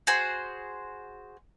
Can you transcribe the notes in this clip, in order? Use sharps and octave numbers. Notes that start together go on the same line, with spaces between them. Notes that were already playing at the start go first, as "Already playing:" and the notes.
F#4 G#4 C5